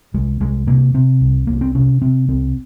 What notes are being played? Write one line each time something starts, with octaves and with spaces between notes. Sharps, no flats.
C2 G#3
C2 G#3
C3 A#3
C3 C4
C2
C2 A#3
C4
C3 C#4
C3 C4
C2 C4